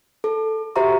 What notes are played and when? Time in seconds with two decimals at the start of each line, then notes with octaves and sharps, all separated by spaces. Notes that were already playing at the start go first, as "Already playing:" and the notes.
0.24 A4
0.76 F#4 G4 C5 E5 A#5 C#6